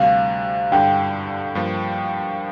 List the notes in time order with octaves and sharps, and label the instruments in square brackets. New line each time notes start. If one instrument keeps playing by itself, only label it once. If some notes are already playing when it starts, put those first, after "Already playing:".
Already playing: [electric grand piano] D2 C3 G3 [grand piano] F5
[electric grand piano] G2 D3 G3 [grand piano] G5
[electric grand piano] G2 F3 A#3